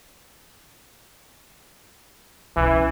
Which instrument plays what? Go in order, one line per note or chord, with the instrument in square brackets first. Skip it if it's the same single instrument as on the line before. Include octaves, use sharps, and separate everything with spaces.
[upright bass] B1 C#4 [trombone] E3